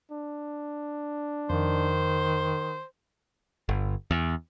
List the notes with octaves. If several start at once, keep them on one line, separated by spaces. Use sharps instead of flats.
D4
F2 D#3 C5
G1
E2